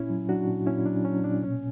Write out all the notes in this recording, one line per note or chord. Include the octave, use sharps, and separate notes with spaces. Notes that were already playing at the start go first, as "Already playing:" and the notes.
Already playing: A#2 C#4 E4
F#3
F#3 D4 F#4
A#2
A#2 C#4 E4
F#3 D4
F#3 C#4
A#2 D4
B2 C#4